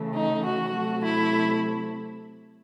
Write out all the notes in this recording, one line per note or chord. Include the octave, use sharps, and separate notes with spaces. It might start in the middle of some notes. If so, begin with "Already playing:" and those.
Already playing: C#3 E3 A3
D#4
F#4
C3 F#3 A3
E4